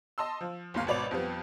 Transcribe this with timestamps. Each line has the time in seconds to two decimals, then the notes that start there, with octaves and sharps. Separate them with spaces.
0.18 D#5 A5 C6 E6
0.41 F3
0.74 G1 D#2 F5
0.87 G#1 B2 C#5 D5 B5 F7
1.11 F2 F3 G3 B3